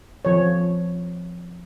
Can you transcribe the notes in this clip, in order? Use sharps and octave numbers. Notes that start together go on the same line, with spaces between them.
F3 C#5